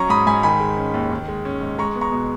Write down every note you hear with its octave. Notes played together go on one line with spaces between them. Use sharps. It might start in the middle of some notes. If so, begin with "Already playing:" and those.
Already playing: F#3 C#4 A#5 C#6
G#2 B5 D#6
G#2 G#5 B5
D#3 G#5 B5
G#3
C#4
D#2
D#3
G#3
C#4
G#2
G#3 A#5 C#6
B3
A#5 C#6
B2